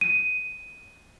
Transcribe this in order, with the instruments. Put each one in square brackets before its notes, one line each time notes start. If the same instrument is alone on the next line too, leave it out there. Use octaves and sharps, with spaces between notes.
[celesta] D#7